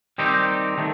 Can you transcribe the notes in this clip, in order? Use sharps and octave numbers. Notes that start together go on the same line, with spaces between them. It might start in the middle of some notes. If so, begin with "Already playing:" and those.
D#3 G3 C4 D#4 G4
D#3 A3